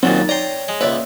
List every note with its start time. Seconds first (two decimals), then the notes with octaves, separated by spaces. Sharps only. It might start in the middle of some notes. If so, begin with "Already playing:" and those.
0.03 D#2 A#2 F#3 C4 D#4 A6
0.29 C#5 D5 G5 A#5 C6
0.68 G#3
0.81 C#2 A#3 B4 C#5 D5 E5